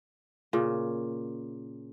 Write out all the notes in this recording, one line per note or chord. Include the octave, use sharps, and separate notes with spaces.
A#2 C#3